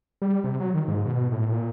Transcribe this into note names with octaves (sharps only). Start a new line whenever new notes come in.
G3
C3
F#3
D#3
G#2
B2
A2
A#2